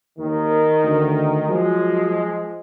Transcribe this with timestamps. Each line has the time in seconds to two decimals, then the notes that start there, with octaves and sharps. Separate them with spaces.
0.18 D#2 D#3
0.83 D2
1.49 F3 F#3 G#3